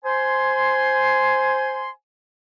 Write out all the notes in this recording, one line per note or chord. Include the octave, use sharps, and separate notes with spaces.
C5 G#5 C6